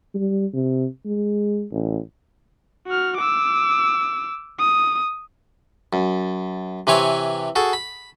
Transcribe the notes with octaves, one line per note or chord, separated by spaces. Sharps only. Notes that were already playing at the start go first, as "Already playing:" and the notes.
G3
C3
G#3
A1
F#4 F6
D6 E6
D#6
F#2
C3 E3 C4 B4 C#5 G#5
F#4 G#4 A4
B5